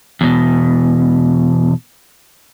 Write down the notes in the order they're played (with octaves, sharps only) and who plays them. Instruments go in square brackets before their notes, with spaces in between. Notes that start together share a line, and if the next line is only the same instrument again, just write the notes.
[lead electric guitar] E2 B2